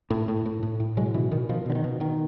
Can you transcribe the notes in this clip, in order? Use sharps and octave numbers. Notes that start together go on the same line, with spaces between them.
A2
A2
A2
A2
A2
B2 F#3 G#3
B2 D3 E3
B2 D#3
B2 D#3 F3
B2 D3
D#3
B2
B2 D#3